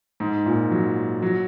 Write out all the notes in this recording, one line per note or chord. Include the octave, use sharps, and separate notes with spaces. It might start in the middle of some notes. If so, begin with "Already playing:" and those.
G#2
A#2
F#3
F#3